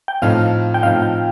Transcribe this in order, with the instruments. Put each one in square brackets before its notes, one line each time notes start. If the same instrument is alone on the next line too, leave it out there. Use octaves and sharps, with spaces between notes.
[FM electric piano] G5
[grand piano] A2 F3 C4 D#4 [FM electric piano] F5
[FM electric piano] G5
[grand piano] A2 F3 C4 D#4 [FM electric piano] F5
[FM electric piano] G5